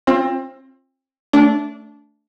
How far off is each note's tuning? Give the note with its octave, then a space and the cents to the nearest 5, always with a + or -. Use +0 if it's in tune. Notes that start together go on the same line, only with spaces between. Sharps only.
C4 +30 F4 +0
A3 +0 D4 -15